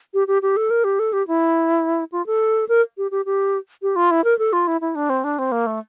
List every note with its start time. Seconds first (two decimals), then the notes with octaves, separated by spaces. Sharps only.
0.14 G4
0.28 G4
0.42 G4
0.57 A4
0.70 A#4
0.84 G4
0.99 A4
1.13 G4
1.28 E4
2.12 F4
2.27 A4
2.69 A#4
2.98 G4
3.11 G4
3.26 G4
3.82 G4
3.96 F4
4.11 E4
4.24 A#4
4.39 A4
4.53 F4
4.67 E4
4.81 E4
4.95 D4
5.10 C4
5.24 D4
5.39 C4
5.52 A#3
5.67 A3